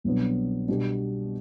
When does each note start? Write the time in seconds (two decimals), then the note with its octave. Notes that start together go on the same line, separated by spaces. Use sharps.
0.04 C2 B2 F#3 B3 D4
0.68 B2 G3 B3 D4 G4